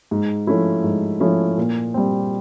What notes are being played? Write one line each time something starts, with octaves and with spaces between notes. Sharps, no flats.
G#2
F3 A3 C#4 E4
G#2
F3 A3 C#4 E4
A#2
G3 C4